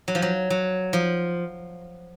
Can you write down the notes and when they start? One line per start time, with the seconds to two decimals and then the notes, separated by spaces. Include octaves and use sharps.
0.08 F#3
0.15 F3
0.22 F#3
0.50 F#3
0.93 F3